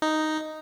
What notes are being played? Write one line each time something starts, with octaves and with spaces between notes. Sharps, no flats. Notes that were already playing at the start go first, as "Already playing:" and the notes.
D#4